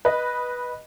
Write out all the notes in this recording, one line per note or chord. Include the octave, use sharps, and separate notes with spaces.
B4 D#5